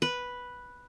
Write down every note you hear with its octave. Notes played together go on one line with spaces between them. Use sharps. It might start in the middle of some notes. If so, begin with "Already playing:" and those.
B4